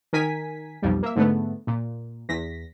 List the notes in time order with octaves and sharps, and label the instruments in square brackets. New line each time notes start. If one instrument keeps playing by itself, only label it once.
[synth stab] D#3 A#4 G#5 B6
B1 F2 G3
A#3 E5
G#2 D3 A3 B3
A#2
E2 A#6 B6